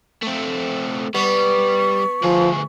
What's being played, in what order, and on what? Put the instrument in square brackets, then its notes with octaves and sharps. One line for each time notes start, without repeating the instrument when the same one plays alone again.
[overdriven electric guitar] A3 C4
[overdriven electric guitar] G3 [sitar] B3 [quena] C#6
[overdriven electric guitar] D2 G#4 [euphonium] F3